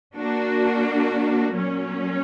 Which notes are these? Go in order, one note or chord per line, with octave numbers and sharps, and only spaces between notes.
A#3 D4 F#4
A#2 F#3 C#4